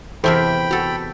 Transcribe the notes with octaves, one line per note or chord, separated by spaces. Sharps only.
E2 C3 A4 A#4 C5 E5 G5 B5
F#4 A4 A#5